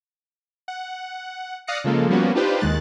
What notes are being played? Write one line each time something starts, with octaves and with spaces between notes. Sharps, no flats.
F#5
D5 F5 D#6 F#6 A#6 C#7
C#3 F3 G#3 A#3 A4
F3 G3 A#3 B3 C#4 F#4
D4 D#4 F4 G4 B4 C5
D#2 D#3 G#3 F#6 A6